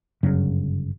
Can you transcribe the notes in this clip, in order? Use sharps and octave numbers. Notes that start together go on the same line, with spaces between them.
G1 F#2 C#3 F#3